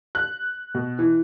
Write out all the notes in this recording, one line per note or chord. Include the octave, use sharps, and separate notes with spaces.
F#6
B2
E3